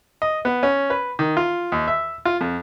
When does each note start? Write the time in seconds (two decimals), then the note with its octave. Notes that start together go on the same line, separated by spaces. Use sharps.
0.22 D#5
0.45 B3
0.63 C#4
0.90 B4
1.19 D#3
1.37 F4
1.72 D#2
1.88 E5
2.25 F4
2.41 F2